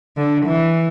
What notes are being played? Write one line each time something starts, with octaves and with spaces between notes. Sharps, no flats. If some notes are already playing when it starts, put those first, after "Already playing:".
D3
E3